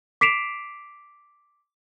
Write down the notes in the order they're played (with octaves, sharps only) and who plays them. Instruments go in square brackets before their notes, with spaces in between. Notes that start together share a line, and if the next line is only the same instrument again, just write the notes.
[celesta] D6 B6 C7 D7 E7 F7